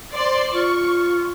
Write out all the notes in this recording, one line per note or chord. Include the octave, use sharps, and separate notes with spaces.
C5 D5 C6
F4 C#6